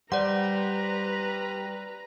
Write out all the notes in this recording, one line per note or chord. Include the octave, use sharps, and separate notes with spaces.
G3 B4 C5 D5 F#5 A#5